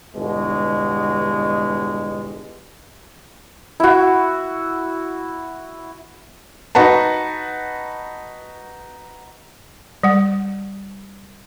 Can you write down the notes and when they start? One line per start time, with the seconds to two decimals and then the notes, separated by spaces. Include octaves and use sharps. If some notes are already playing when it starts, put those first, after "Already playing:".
0.15 G1 E2 B2 G#3
3.80 E4 F#4
6.75 D#4 F#4 B4 F#5 A5
10.03 G3 F#5